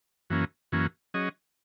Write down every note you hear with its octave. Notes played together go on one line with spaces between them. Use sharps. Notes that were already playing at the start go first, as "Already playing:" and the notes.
F#2 E3 A#3 C#4
F#2 E3 A#3 C#4
F#3 C#4 G#4 D#5